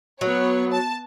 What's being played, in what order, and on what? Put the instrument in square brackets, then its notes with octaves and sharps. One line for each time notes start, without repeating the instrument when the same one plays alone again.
[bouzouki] F#3 [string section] B3 C#5
[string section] A5